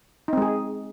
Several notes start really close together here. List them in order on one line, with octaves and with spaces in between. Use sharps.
D#4 C4 G#3 G#4